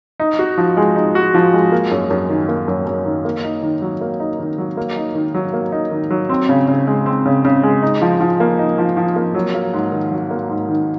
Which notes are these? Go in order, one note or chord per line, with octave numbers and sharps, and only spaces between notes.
D#4
F#4
F3
G#3
D#4
F#4
F3
G#3
A#3
F#2
F#2
D#3
A#3
F#2
F#2
D#3
A#3
D#4
D#3
F#3
A#3
D#4
D#3
F#3
A#3
D#4
D#3
F#3
A#3
D#4
D#3
F#3
C4
C#3
C#3
G#3
C4
C#3
C#3
G#3
D#4
F3
F3
A#3
D#4
F3
F3
A#3
F#3
A#3
G#2
D#3
F#3
A#3
G#2
D#3